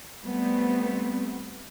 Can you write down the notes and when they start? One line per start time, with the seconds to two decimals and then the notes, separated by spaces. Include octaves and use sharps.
0.23 G3 A3 B3 C4